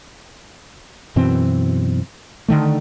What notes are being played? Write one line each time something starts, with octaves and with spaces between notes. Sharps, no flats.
F#2 B2 E3 C4
D3 D#3 A3